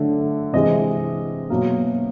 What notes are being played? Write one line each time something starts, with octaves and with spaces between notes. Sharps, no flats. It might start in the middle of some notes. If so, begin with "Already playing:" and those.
Already playing: D3 F#3 A3
C3 E3 G#3 D#5
B2 F#3 A#3